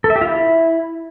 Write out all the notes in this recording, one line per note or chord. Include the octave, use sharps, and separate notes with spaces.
A4
E5
G4
F4
E4